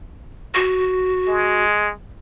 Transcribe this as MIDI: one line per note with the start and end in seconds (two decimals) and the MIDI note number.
0.55 1.63 66
1.28 1.91 56